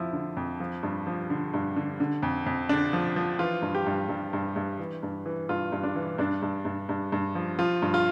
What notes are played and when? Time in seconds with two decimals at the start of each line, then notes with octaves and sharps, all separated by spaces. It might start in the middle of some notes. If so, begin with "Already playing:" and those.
Already playing: F2 F3 E4
0.13 D3
0.37 F2
0.60 F3
0.83 G2
1.07 F3
1.30 D3
1.54 G2
1.76 D3
2.00 D3
2.23 F2
2.46 F2
2.69 D3 D4
2.93 F3
3.16 F3
3.39 E3 F4
3.62 G2
3.75 G4
3.87 G2
4.09 G2
4.33 G2
4.56 G2
4.79 E3
5.03 G2
5.26 E3
5.49 G2 F4
5.72 G2
5.83 D4
5.96 E3
6.18 G2 D4
6.42 G2
6.65 G2
6.89 G2
7.12 G2
7.35 F3
7.59 F3 F4
7.82 G2
7.94 F4